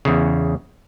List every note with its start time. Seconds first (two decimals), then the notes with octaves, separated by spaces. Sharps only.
0.05 E2 C#3